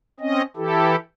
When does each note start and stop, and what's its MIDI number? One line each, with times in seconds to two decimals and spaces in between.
0.20 0.42 60
0.20 0.42 61
0.20 0.42 75
0.56 0.96 52
0.56 0.96 64
0.56 0.96 67
0.56 0.96 69